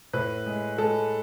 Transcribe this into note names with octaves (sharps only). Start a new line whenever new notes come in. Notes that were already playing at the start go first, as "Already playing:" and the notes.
A2 B4
G#3
G#3 A4